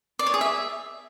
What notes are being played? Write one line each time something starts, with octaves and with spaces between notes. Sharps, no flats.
D5
C#5
G#4
E5